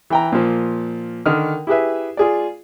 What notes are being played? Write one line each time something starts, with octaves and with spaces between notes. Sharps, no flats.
E3 G5 A#5
A#2 F3
D3 D#3 F6
E4 G4 G#4 B4 E5
F4 G#4 D5